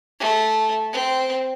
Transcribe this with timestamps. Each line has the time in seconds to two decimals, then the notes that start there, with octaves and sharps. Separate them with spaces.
0.20 A3
0.92 C4